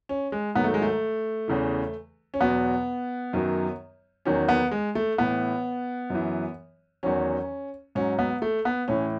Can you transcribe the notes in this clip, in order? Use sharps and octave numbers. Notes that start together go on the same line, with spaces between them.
C#4
G#3
G#2 D#3 F#3 B3
A3
G#3
A3
E2 C#3 E3
C#4
E2 B2 F#3 B3
F#2 D#3 F#3
E2 D#3 F#3 C#4
B3
G#3
A3
A2 E3 B3
F#2 E3
E2 D#3 F#3 C#4
G#2 F#3 C#4
B3
A3
B3
A2 E3 C#4